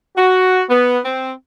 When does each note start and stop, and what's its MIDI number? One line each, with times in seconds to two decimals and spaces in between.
0.17 0.62 66
0.69 0.97 59
1.05 1.31 60